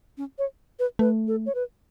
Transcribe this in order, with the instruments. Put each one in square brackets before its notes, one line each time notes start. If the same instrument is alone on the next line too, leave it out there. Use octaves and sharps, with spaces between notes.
[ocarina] C#4
C#5
B4
[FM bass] A3 [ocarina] B4
[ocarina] A4
C#5
B4